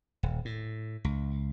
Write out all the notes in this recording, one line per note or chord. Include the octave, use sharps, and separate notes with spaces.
D#1
A2
C#2